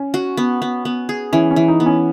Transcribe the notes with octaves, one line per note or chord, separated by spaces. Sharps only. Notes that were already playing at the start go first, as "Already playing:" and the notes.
Already playing: C#4
F#4
B3
B3
B3
G#4
E3 C#4
C#4
E3
D#4
B3
C#4